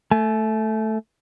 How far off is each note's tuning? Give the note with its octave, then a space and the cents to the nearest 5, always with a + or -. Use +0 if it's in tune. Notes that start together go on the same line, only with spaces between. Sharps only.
A3 +0 A5 -45